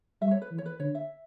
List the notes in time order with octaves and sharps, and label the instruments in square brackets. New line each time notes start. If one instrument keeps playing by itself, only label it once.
[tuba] G3 [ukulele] E5
[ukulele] C#5
B4
[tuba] E3
[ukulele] C#5
B4
[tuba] D3 [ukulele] C#5
[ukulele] E5